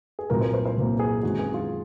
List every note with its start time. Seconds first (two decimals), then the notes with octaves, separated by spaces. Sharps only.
0.19 G#4
0.30 C2 A#2 F#3 A#3 A#4
0.41 C5
0.54 C5
0.66 C5
0.77 C2 A#2 F#3 A#3
0.99 G#4
1.23 F#2 D#3 G#3 C4 F#4
1.39 G#4
1.54 F4